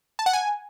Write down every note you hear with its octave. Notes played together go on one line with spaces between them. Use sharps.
A5
F#5
G#5